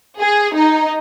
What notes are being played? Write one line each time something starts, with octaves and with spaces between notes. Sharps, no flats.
G#4
D#4